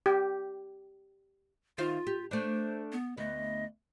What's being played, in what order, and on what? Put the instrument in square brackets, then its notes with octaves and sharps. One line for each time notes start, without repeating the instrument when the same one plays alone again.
[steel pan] G4
[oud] D#3 C5 F5 [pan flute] F4
[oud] G4
[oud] A3 D4 [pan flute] C5
[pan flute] B3
[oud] D2 B3 [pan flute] D#5